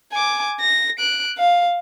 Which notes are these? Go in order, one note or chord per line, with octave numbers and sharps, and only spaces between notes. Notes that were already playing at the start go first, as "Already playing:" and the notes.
G#5 D6
A#6
F#6 D7
F5